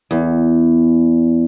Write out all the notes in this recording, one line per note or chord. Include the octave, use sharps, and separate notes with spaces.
E2